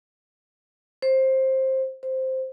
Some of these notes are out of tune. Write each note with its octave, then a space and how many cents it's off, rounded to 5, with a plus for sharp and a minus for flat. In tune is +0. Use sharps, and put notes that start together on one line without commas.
C5 +15
C5 +0